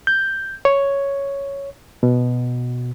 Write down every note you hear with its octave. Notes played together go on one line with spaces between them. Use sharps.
G6
C#5
B2